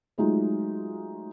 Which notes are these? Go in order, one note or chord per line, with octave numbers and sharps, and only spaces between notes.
F#3 G#3 A3 D#4 F4